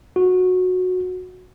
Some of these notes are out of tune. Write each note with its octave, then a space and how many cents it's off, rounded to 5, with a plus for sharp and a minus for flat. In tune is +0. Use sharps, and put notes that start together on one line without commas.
F#4 -15